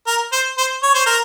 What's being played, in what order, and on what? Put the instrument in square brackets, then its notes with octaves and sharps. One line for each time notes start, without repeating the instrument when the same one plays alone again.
[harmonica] A#4
C5
C5
C#5
C5
A#4